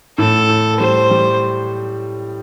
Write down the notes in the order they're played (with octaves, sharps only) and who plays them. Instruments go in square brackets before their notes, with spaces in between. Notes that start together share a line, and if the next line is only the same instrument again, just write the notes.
[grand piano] A2 [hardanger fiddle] A4
[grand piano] A2
[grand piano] G3 [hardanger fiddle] C5
[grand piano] G3